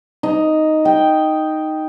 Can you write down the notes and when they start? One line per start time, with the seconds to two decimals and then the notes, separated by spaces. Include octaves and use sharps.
0.23 D#4
0.85 G5